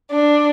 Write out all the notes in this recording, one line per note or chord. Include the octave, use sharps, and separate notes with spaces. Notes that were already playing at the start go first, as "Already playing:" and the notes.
D4